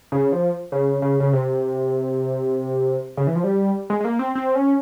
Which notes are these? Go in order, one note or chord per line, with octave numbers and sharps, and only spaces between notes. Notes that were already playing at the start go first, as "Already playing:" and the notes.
C#3
F3
C#3
C#3
C#3
C3
C#3
E3
F3
G3
G#3
G#3
A#3
C4
C4
C#4